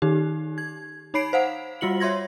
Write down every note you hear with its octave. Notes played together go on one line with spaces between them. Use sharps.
D#3 D#4 G4
G#6
D#4 C#5 B5 C7 D7
C5 F5 F#5
G3 F4 F#4 C#7 F#7
C#5 E5 C6 G#6 A#6